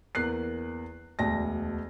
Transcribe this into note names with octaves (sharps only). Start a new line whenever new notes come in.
E2 A#3 F#6 C7
E1 D2 A5 A#6